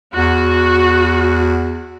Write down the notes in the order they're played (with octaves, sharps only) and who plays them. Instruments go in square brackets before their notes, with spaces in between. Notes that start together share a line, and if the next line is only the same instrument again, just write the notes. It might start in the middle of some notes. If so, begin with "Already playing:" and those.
[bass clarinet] E2 [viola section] F#4